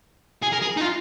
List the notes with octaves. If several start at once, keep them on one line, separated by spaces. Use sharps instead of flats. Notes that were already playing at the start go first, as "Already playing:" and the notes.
G#4
A#4
G#4
D#4
F4